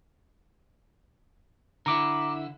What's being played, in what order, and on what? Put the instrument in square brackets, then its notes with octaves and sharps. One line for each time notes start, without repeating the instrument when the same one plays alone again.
[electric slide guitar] D3 E4 [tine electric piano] A#5 D6